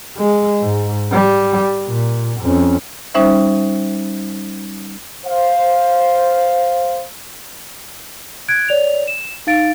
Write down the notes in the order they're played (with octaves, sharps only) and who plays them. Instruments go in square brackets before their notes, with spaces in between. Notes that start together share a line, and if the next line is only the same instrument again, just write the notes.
[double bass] G#3
G#2
G3
A#2
F2 C#4
[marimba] G3 C#4 D#4 C5 E5
[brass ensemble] C5 F5
[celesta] F#6 G#6 D7
C#5 D5 F7
E7
D#4 F5 A6 D7